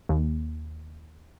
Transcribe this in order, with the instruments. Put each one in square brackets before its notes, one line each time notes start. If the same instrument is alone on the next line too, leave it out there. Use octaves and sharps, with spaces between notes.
[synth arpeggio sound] D#2